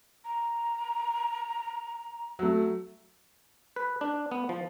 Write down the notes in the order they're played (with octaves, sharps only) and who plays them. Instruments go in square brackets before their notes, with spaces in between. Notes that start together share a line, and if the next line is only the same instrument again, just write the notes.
[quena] A#5
[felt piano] F#3 A3
[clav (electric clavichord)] B4
D4
B3
F3